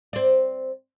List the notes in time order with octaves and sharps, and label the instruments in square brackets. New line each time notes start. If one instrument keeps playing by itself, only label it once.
[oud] C4 D5